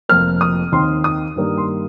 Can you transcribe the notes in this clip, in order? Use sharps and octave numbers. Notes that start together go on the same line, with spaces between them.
F1 F2 F3 A#3 F6
D#6
D#2 D#3 C4 C6
D#6
G2 D#3 G3 A#3
C6